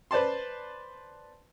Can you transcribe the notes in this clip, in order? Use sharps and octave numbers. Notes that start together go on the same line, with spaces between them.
B4 C5 D5 A5 C6